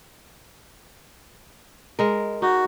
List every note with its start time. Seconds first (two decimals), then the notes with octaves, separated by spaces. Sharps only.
1.99 G#3 A#4
2.42 D#4 F#4